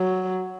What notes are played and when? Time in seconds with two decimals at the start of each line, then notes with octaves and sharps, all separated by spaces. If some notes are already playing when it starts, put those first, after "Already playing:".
Already playing: F#3